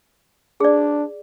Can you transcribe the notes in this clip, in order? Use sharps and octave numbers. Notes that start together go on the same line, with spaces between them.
D4 G#4 D5